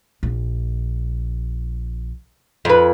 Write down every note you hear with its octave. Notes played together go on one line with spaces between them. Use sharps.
A#1
F2 B4